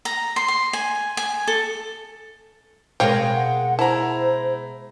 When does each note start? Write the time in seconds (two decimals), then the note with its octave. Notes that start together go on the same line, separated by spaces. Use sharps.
0.05 A#5
0.36 C6
0.48 C6
0.73 G#5
1.17 G#5
1.47 A4
3.00 B2 G#3 C4 A#4 C#5 F5 G5
3.35 F#5
3.79 E4 C5 A5 A#5